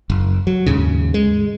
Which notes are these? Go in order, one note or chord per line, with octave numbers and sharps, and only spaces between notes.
F#1
F#3
D#2 G#2 C#3
G#3